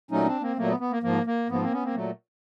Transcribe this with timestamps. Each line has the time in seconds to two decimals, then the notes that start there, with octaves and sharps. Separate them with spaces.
0.11 A#2 F#3 A3 C#4 D#4
0.26 C4 D4
0.41 A#3 C4
0.57 A#2 F#3 A3 A#3
0.68 B3
0.80 B3
0.91 A#3
1.03 G#2 F3 A#3
1.26 A#3
1.49 G#2 F3 A#3 B3
1.60 A#3 C4
1.72 B3 C#4
1.83 A#3 C4
1.94 A#2 F#3 A3